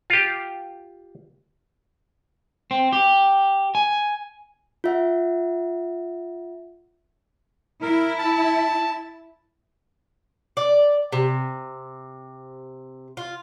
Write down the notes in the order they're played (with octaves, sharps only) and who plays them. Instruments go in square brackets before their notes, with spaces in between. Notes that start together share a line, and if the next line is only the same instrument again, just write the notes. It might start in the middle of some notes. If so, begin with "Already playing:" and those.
[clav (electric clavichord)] F4 G4
[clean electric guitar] C4
G4
G#5
[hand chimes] F4 E5 F#5
[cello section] E4 [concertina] A#4
[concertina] A5
[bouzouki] D5
C3
F4